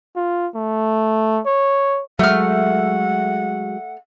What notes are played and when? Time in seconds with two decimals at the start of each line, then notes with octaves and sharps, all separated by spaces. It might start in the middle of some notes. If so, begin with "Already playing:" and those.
0.16 F4
0.55 A3
1.46 C#5
2.19 F#3 G#3 A3 F#5 F6